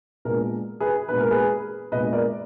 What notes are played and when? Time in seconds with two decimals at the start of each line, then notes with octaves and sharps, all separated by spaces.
0.25 A#2 G#3 B3 D4 A#4
0.80 G#4 B4
1.08 A#2 G#3 B3 D4 B4
1.20 A#4
1.31 G#4 B4
1.92 A#2 G#3 B3 D4 B4 D#5
2.13 A#4 D5